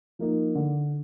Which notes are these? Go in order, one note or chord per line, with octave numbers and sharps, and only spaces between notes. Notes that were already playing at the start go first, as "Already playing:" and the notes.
F3 A#3 D#4
D3